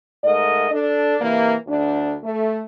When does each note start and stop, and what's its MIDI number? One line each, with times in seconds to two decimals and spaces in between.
0.24 0.68 44
0.24 0.68 57
0.24 0.68 70
0.24 0.68 75
0.71 1.15 62
0.71 1.15 69
1.20 1.53 48
1.20 1.53 52
1.20 1.53 58
1.67 2.15 38
1.67 2.15 62
2.23 2.61 57